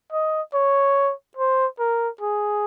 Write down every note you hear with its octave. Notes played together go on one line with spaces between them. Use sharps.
D#5
C#5
C5
A#4
G#4